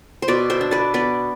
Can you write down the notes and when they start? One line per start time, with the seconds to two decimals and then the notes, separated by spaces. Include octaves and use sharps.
0.22 C5
0.28 B2 B4 D5
0.50 C5 E5
0.61 D4
0.71 B4 D5
0.94 B3 B4 D5